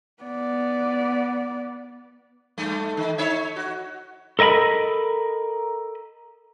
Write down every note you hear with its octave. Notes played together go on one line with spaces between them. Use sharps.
B3 D5
G2 A3
D#3
D#4 C#5 E5
F#4
A4 A#4 D#5 G5 B5